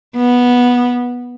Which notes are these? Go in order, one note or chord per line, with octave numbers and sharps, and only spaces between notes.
B3